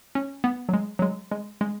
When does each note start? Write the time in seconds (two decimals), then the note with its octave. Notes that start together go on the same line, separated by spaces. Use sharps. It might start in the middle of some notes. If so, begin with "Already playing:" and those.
0.15 C#4
0.44 B3
0.69 F#3
0.73 G#3
0.99 F#3
1.02 G#3
1.31 G#3
1.61 G#3